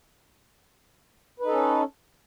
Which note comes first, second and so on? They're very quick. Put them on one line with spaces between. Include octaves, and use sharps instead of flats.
B4 D#4 A4 C#4